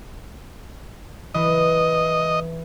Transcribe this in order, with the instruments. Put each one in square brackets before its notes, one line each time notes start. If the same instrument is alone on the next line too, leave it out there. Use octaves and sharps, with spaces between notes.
[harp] E3 [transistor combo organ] D#5